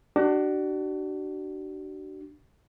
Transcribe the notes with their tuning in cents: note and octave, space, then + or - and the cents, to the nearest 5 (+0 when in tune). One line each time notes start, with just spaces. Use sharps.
D4 +20 F#4 +40